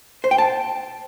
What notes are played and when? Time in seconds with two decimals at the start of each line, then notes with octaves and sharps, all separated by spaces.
0.24 C5
0.31 G5
0.38 A5